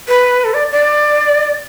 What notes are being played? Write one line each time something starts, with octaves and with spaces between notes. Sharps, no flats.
B4
A4
D5
D5